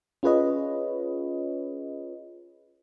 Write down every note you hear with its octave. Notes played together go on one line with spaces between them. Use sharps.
C#4 F4 G#4 B4 C#5 D#5